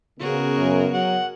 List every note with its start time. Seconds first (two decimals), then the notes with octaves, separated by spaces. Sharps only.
0.20 C#3 B3 F#4 G#4 A#4
0.59 F#2
0.93 F#3 F#5